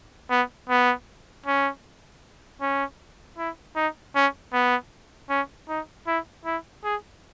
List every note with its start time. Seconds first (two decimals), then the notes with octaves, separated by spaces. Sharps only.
0.31 B3
0.69 B3
1.46 C#4
2.61 C#4
3.38 E4
3.76 D#4
4.15 C#4
4.53 B3
5.30 C#4
5.69 D#4
6.07 E4
6.45 E4
6.84 G#4